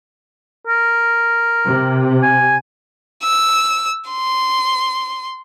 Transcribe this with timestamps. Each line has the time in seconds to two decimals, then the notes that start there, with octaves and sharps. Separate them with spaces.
0.67 A#4
1.66 C3
2.22 G#5
3.23 E6
4.09 C6